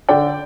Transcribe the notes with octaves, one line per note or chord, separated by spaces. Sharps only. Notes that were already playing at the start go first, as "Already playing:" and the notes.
D3 D5 G5